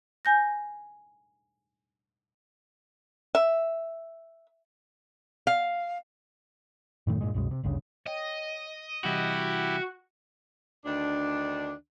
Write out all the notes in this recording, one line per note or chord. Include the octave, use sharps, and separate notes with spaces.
G#5 G6 A#6
E5
F5
F#2 A2 D#3 A3
G2 A#2 G#3
C2 F#2 B2 G#3
C3
G#1 D2 G2 C#3
C#5 D#5 G5
C3 E3 G3 E4 F#4 G4
D2 D#3 D4